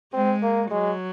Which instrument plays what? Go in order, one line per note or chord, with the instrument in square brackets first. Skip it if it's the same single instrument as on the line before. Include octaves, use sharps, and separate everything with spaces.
[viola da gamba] G#3 [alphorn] C4
[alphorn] A#3
[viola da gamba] F#3 [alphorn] G#3